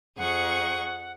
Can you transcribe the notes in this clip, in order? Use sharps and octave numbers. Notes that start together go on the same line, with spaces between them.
F2 G#4 F#5 C#6